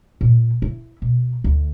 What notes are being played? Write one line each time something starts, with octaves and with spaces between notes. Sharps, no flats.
A#2
E4
B2
D2